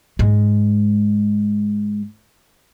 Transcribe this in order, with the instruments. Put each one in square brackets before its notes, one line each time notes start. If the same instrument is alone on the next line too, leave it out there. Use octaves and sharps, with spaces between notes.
[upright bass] G#2 G#3